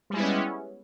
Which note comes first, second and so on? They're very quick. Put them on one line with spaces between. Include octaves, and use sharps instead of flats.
G3 G#3 E4 B3 C#4